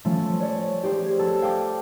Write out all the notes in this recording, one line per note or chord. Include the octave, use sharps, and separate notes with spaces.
F3 A3 C#4
C#5 D5
G4 G#4 C5
G#6
A4
F5 G5 D6